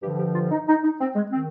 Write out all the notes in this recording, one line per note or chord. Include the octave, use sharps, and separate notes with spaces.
G2 D3 F3 G4
G4
F4
D#4
D#4
D#4
C4
G#3
D#3 C4